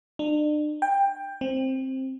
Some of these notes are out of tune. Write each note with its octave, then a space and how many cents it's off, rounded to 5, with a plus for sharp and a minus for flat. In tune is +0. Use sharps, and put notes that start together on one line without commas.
D4 +40
G5 +15
C4 +10